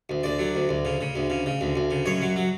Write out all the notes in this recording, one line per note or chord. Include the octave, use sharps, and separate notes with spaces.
D2
D2 D5
F#3
D2
D2
C#3
C#3
D2
C#3
C#3
D2
D2
C#3
F#2 C#5
F#3
F#3